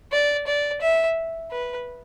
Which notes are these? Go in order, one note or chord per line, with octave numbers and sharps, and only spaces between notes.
D5
D5
E5
B4